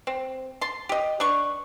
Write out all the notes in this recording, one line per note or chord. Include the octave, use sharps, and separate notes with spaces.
C4
A5 C6
G4 D#5
D4 B4 C#6